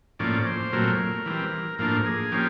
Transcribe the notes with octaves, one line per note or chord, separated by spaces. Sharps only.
A2 F3 A#3 C#4 D5
C5
A#2 F#3 A3 C4 A#4
E3 G3 C4
A2 F3 A#3 D4 A#4
G#4
F3 A#3 C#4 G4